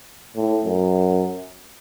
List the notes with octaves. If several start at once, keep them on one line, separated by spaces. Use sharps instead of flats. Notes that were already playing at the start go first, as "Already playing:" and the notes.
A2
F#2